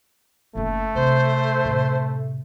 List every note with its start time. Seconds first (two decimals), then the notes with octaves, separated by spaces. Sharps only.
0.55 F#1 A3 A#3
0.95 C3 C5
1.65 A2 C3